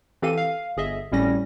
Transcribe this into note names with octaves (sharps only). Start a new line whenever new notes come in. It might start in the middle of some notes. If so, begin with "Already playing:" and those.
E3 C4 G4 A4 F5 D#7
F5
G1 G#4 D#5 E5
G#1 A2 G3 C#4 A#6